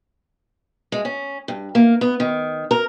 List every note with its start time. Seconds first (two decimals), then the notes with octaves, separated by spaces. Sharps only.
0.92 G#3
1.05 C#4
1.48 G2
1.75 A#3
2.01 B3
2.20 D#3
2.71 A#4